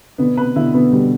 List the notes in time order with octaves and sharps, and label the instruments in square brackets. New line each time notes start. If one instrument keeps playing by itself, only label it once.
[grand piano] B2 D3 [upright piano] B3
[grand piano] C3 [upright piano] B4
[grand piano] B2 D3 [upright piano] E4
[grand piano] B2 D3 [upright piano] B3
[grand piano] B2 D3 [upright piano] G3